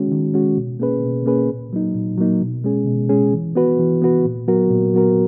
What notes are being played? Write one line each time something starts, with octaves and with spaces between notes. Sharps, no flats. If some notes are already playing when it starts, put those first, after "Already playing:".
Already playing: D#3 G#3 C#4 F#4
D#3
G#3 C#4 F#4
B2
A#3 C#4 G#4 B4
B2
A#3 C#4 G#4 B4
A#2
F#3 A#3 D#4
A#2
F#3 A#3 D#4
B2
G#3 C#4 G#4
B2
G#3 C#4 G#4
E3
B3 F#4 B4
E3
B3 F#4 B4
A#2
F#3 B3 F#4 A#4
A#2
F#3 B3 F#4 A#4